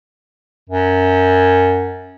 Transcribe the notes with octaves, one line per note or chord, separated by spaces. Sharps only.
F#2